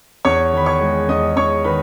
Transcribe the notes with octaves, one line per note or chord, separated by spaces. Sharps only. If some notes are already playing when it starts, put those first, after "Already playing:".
E2 C#5 C#6
D#3 B5
C#5 C#6
G#3
E2 D#5 D#6
E2 C#5 C#6
D#3 B4 B5